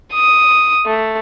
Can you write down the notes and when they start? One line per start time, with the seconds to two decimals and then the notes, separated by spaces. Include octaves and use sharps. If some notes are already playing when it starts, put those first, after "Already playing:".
0.13 D#6
0.86 A3